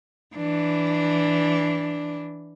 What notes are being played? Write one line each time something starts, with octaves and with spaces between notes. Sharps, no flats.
E3 D4